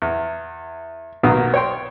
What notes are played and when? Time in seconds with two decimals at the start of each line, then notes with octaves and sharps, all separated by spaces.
0.02 E2
1.23 B1 D#3 F#3 A#3 B3 D#6
1.54 C#5 G5 C6